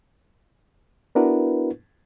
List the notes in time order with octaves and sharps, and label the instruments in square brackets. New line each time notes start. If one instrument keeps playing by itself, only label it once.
[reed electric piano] B3 D4 E4 F#4 A#4 B4